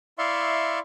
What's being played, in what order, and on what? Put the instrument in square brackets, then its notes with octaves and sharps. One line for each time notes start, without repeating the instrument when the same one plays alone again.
[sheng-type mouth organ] E4 D5 E5 F5 C6 C#6